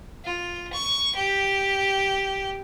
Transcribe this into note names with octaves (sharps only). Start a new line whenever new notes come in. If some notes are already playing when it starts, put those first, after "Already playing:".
F4
C#6
G4